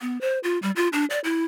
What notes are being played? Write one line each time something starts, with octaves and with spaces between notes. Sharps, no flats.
B3
C5
F4
G3
F4
D4
D5
E4